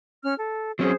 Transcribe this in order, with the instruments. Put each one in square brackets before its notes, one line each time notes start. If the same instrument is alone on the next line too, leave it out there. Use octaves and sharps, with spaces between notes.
[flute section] C#4 F6
A4
[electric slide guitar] F#3 C4 C#4 [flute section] G#4 C5